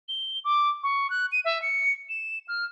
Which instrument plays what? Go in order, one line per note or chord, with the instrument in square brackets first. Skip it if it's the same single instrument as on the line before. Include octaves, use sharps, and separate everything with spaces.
[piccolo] G7
D6
C#6
F#6
D#7
E5
C#7
E7
F6